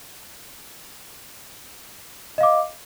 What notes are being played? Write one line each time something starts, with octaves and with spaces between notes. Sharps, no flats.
D#5 F5 D6